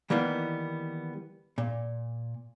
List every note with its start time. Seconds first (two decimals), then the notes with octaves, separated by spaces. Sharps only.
0.10 D#3 E3 G3 A#3 B3
1.58 A#2